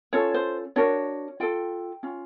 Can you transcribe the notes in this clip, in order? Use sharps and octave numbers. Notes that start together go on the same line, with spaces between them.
C#4 F4 A4 C#5
C5
D4 F#4 A#4 C#5
F4 A4 G5
C#4 F4